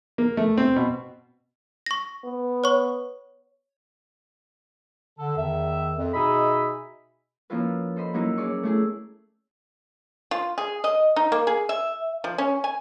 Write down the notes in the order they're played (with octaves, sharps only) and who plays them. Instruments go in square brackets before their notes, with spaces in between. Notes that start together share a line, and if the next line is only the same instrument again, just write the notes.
[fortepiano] A#3
A3
C4
B2
[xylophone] C#6 A#6
[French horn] B3
[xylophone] C#5 C#6
[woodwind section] D3 A4
E2 D#3 E5
F2
B2 D#4 G#4 D#5 E5 B5
[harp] F3 A#3 C#4 E4 F4 B4
A4 C5 D#5 B5 C6
F#3 A#3 C#4 D#4 E4
C#4 G#4 D5 C#6
A3 E4 G#4
[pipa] F4
G#4
D#5
D#4
A#3
G#4
E5
F3
C#4
G#5